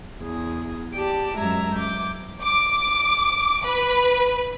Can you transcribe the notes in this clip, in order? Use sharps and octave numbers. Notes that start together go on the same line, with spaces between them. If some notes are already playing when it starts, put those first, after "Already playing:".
E2 G#4
G4 D5 A5
F#2 G#3 E5 A#5 G#6
D6 G6
D6
B4